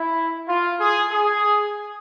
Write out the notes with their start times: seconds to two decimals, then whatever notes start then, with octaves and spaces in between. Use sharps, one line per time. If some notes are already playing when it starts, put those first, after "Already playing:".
Already playing: E4
0.49 F4
0.80 G#4
1.12 G#4